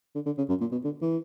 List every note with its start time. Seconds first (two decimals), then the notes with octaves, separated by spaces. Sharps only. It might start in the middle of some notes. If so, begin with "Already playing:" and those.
0.15 D3
0.26 D3
0.38 C#3
0.49 F#2
0.61 A#2
0.72 B2
0.85 D3
1.02 E3